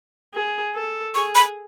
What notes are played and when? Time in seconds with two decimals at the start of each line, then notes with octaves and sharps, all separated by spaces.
0.34 G#4
0.75 A4
1.15 G#4 C#6
1.35 B5